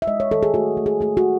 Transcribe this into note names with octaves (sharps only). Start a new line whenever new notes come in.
E5
G#3 D#5
C#5
D#3 A4
G#4
A3 F#4
A3
G#4
A3 G#4
F#4